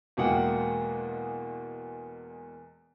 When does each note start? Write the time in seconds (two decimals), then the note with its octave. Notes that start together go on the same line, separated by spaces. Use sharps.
0.17 E2 B2 G#3 A#3 F#5 G5